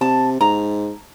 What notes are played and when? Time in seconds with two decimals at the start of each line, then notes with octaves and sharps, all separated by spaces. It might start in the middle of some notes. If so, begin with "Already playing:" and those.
0.01 C3 A5
0.41 G#2 A#5